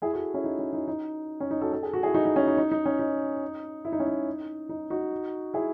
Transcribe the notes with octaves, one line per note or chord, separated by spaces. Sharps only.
E4 G#4
F#4 A4
C#4 E4
D#4
C#4
D#4
D#4
C#4
D#4
F#4 A4
A4
G#4
F#4
E4 G#4
D#4 F#4
D#4
C#4
D#4
D#4
D#4
C#4
D#4
E4
D#4
C#4
D#4
D#4
D#4 F#4
E4 G#4